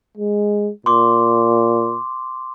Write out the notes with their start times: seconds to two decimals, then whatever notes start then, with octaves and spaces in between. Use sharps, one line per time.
0.17 G#3
0.86 A#2 C6 D6